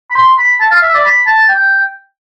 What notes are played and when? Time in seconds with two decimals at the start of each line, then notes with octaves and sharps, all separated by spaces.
0.11 B5
0.15 C6
0.38 B5
0.60 A5
0.71 F5
0.82 E5
0.94 D5
1.05 B5
1.26 A5
1.49 G5